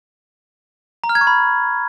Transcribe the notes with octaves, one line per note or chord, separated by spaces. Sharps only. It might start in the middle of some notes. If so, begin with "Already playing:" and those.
A#5
F6
G#6
C#6
B5